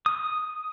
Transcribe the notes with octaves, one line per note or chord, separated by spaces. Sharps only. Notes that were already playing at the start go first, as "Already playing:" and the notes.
D#6